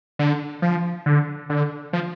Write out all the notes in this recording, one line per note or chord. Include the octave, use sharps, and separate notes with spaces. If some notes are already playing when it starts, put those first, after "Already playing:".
D3
F3
D3
D3
F3